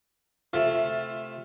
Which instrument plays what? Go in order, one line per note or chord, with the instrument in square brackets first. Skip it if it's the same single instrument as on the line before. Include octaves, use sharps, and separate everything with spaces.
[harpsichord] C3 A3 [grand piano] F4 E5